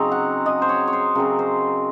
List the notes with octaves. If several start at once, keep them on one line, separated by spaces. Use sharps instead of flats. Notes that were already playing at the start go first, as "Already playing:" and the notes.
Already playing: C#3 F#3 C4 D#4 A#5
F#5
D#5
C5
C#5
C#5
C5
C#3 F#3 C4 A#4
C5